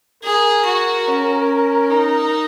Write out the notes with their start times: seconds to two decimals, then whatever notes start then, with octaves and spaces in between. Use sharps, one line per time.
0.23 G#4 A#4
0.65 F#4
1.07 C#4
1.90 D#4